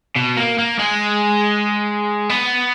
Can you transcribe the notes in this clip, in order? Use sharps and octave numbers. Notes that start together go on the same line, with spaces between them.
B2
A#3
A#3
G#3
B3